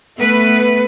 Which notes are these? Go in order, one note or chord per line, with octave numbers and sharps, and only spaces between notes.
A3 B3 B4